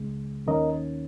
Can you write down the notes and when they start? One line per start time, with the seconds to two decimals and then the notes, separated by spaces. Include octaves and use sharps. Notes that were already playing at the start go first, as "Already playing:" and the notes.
Already playing: C#2 C#3 G#3
0.47 D#2 D#3 A#3 C#4 A#4 D#5